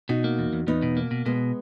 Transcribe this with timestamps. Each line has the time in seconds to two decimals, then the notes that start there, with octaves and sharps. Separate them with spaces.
0.09 B2 D#4 F#4
0.24 A#3
0.39 E2
0.53 E2
0.67 E2 B3 D#4
0.83 B2
0.97 A#3
1.11 B2
1.26 B2 G#3 B3